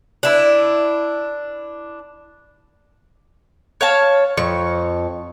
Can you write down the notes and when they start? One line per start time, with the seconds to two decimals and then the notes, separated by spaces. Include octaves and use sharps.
0.23 D4 E4 B4
3.81 C#5 F5 A5
4.37 F2 C#6